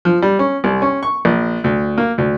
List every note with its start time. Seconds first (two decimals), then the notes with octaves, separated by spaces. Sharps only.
0.05 F3
0.22 G3
0.39 C#4
0.64 C2
0.82 C#4
1.03 C#6
1.25 A#1
1.64 D2
1.98 A#3
2.18 D2